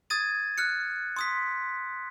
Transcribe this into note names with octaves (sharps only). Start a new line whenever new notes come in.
D#6 G#6 A6 D#7
F6 F#6 C#7
C6 D#6 B6